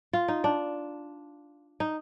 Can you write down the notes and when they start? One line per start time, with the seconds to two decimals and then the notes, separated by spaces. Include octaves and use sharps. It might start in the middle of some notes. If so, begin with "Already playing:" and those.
0.13 F4
0.28 D#4
0.44 D4
1.80 D#4